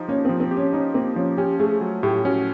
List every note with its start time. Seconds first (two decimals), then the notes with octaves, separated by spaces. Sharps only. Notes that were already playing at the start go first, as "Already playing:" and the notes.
Already playing: F3 D#4 G4
0.08 A#3 C#4
0.25 F3 C4
0.40 C4
0.51 G4
0.57 C#4
0.72 C#4 D#4
0.94 A#3 C4
1.16 F3 C#4
1.37 C#4 G4
1.60 A3 G#4
1.81 F#3
2.03 A2 G4
2.25 C#4 F#4